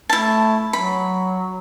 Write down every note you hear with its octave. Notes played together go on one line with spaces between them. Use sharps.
A3 E4 A5
F#3 B5